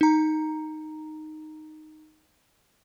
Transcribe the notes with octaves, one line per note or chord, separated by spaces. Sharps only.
D#4 A#5